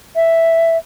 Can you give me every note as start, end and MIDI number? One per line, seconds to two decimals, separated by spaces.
0.16 0.77 76